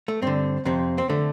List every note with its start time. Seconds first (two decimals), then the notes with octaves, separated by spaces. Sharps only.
0.08 A3
0.22 G2 D3 C4
0.65 F2 C3 C4
0.98 C4
1.10 D3 A3